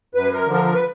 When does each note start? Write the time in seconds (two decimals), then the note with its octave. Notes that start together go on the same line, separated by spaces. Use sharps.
0.15 F#2 B4
0.34 A#4
0.44 D3 F3
0.54 A#4
0.65 A#4
0.74 B4